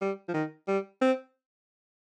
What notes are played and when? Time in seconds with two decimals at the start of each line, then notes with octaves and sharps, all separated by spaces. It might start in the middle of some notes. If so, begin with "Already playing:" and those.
0.01 G3
0.28 F3
0.34 D#3
0.68 G3
1.01 C4